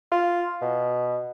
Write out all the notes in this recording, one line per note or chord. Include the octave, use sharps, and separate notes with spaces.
F4
B2